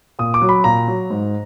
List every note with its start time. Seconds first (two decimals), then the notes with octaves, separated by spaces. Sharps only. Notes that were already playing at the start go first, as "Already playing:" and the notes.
0.19 A#2 D#6
0.34 D6
0.41 F#3
0.49 B5
0.64 A#2 A#5
0.88 F#3
1.10 G#2